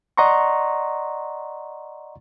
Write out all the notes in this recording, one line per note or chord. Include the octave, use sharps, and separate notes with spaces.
D5 D#5 F#5 A#5 C6 C#6